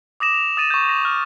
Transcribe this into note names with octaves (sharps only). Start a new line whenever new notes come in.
D6 D#6 A#6 E7
F7
D#6 A6 D#7 E7
C#6 G6
A#6
F6